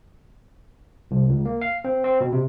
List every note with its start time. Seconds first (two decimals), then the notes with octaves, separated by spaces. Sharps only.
1.11 C2
1.29 C#2
1.45 A#3
1.61 F5
1.85 C4
2.04 C4
2.21 B2
2.33 C3